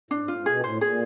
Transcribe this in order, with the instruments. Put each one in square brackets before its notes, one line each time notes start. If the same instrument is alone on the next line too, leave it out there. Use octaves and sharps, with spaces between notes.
[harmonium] A2 [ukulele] D4
[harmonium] G#2
[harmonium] A2 [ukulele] F4
[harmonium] G#2
[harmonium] B2 [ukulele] G#4
[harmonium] A2 [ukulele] C5
[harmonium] A#2 [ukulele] G#4